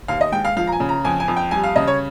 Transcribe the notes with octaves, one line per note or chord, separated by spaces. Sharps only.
D#2 F5
D#5
G#3 G5
F5
F3 F5
A#5
G#5
C#3
A#5
F2 G#5
G#5
F2
G5
G3 G#5
F5
C#3 D#5
C#5